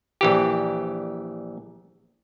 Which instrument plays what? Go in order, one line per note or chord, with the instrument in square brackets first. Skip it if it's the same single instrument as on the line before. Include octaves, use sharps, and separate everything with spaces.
[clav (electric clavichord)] A#1 E3 G4